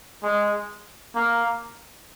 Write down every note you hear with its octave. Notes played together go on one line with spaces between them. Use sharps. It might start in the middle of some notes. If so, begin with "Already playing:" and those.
G#3
A#3